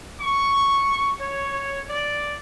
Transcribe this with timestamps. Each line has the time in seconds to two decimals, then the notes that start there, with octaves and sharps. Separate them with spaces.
0.21 C#6
1.21 C#5
1.90 D5